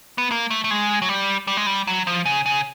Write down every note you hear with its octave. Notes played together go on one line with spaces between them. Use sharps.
B3
A#3
A3
A3
G#3
F#3
G3
G3
G#3
G3
F#3
F3
C#3
C#3